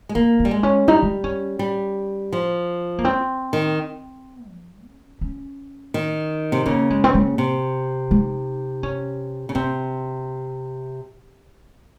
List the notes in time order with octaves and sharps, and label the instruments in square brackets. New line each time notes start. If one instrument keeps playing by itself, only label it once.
[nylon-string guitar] G#3
[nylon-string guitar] A#3 [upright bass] C4
[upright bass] C4
[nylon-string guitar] G3
G#3
[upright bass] C#4
[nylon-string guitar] G3 [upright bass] D#4
[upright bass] D#4
C#4
[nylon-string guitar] G3
F3
[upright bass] A#3
C4
[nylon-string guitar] D#3
[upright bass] F3
C#4
C#4
[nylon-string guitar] D#3
C3
[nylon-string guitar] C#3 [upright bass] A#3
[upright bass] G#3
C4
A#3
[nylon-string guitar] C3
[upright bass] D#4
C#4
[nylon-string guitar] C#3
[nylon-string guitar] C3 [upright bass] C4